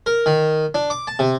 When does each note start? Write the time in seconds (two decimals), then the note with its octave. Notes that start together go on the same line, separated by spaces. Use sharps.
0.06 A#4
0.26 D#3
0.75 D4
0.90 D6
1.07 A5
1.19 C3